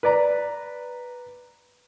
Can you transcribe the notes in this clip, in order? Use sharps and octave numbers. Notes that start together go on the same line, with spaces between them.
B4 D5 A#5